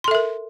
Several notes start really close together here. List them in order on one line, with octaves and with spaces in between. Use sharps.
C6 A4 E5 A#4